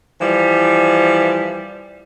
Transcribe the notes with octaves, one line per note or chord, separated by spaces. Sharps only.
E3 F3 G3